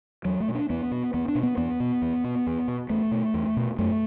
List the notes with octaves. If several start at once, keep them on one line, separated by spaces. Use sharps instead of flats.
E2 F#3
A3
B2
D4
E2 B3
B2
E2 B3
D4
B2
B3
E2 B3
B2
E2
B2
E2
B2
E2 A3
B2
E2
B2
F#2 A3